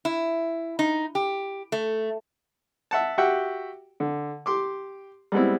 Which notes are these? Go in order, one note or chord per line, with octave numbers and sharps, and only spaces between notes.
E4
D#4
G4
A3
E5 F#5 A5
F#4 G4 E5 F#5 G5
D3
G4 C6 D6
G3 G#3 B3 C4 E4